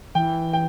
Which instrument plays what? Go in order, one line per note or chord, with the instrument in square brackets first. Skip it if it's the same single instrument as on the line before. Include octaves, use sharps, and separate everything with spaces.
[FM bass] E3 [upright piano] G5
[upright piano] G5